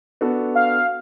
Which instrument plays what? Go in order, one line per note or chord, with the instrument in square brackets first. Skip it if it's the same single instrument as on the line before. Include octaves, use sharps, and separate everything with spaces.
[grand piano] B3 D4 F#4 A4
[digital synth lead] F5